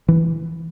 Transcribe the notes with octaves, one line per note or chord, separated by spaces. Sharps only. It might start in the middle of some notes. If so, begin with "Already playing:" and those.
E3